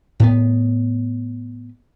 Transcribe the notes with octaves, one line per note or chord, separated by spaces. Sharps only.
A2 B3